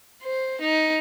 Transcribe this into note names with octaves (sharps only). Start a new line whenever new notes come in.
C5
D#4